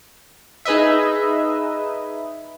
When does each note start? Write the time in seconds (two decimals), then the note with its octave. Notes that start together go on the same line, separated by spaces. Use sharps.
0.65 D#4 G#4 B4 D#5 E5